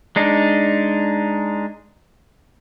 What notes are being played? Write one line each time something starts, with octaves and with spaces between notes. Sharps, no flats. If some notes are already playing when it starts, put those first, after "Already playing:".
G#3 D4 D#4